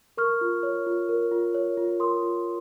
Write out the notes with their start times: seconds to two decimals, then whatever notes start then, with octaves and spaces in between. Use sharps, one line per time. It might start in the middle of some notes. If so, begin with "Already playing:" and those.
0.17 A#4 C#6 F6
0.41 F4
0.63 C#5
0.87 F4
1.09 A#4
1.31 F4
1.54 C#5
1.77 F4
2.00 A#4 C6 D#6
2.23 F4